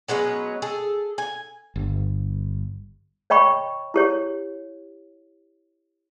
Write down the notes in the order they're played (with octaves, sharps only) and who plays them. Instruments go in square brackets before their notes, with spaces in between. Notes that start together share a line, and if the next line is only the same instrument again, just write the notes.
[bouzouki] F#3 G#3 B3 C#4
G#4 A4
G#5
[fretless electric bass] G1
[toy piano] C#5 D#5 G5 B5 C#6
E4 G4 C#5